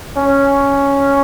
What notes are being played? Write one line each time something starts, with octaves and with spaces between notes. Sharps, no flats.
C#4